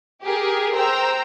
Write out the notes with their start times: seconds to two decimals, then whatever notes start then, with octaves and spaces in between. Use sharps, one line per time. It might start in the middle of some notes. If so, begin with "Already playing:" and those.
0.23 G4 G#4 A#4
0.75 C5 G5 A#5 E6